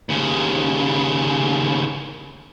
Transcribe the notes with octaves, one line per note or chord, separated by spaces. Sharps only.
D#2 C#3